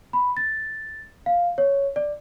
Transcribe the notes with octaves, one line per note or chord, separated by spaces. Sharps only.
B5
A6
F5
C#5
D5